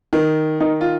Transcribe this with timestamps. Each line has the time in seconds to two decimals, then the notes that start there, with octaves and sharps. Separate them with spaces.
0.13 D#3
0.60 D#3 D#4
0.81 F4